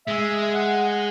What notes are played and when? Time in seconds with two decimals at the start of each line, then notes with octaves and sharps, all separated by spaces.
0.07 G#3 E5
0.54 F#5